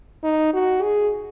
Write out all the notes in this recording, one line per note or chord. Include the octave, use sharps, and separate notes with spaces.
D#4
F#4
G#4